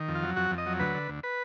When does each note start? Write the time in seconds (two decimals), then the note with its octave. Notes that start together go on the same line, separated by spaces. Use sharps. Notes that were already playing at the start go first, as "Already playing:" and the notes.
Already playing: D#3
0.08 F2
0.15 F4
0.22 F#3
0.36 F2 F#4
0.51 F2
0.58 D#5
0.66 F#3
0.80 D2 B4
0.94 D3
1.08 D2
1.23 B4